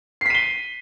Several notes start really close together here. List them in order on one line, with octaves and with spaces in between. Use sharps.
C7 B6 D#7 G7